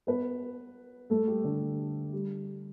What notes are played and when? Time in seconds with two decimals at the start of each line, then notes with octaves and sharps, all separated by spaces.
0.07 B3 B4
1.10 A3 A4
1.27 G3 G4
1.44 D3 D4
2.13 G3